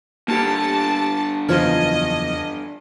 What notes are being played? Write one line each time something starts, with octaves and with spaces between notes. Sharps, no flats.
G2 D3 A#3 G4 A5
F#1 E2 F3 D#5 A5 F6 G#6